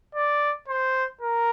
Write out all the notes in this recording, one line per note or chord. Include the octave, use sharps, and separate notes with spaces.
D5
C5
A#4